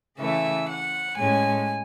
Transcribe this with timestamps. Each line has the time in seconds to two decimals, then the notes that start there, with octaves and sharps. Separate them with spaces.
0.18 C#3 E3 A3 E5
0.67 F#5
1.16 A2 G#3 C#4 G#5